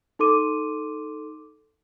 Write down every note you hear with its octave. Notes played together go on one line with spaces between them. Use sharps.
D#4 A4 C6 D6 D#7